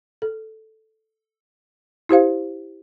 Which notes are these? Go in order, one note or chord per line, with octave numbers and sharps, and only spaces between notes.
A4
E4 G4 C5 F5